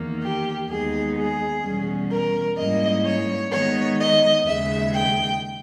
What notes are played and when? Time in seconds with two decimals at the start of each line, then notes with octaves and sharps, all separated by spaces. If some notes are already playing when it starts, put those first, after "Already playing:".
Already playing: E2 D#3 A#3
0.22 G4
0.69 D#2 D#3 G#3 B3 D#4 G#4
1.16 G#4
1.62 E2 B2 G3 C#4
2.10 A#4
2.57 G#2 G3 A#3 C#4 E4 D#5
3.04 C#5
3.51 D#3 G#3 B3 D#4 C#5
3.99 D#5
4.46 D#2 C#3 G#3 E5
4.93 G5